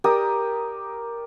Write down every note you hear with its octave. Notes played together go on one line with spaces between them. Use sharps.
G4 A#4 D5 D#6